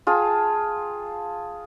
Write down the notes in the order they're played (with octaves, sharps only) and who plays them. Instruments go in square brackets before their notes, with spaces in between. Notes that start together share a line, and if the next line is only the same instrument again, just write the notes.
[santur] F4 G#4 G5 A5